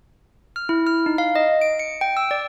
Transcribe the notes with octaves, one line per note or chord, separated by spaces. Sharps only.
F6
E4
F6
D#4
F5
D#5
D7
C#7
G5
E6
D5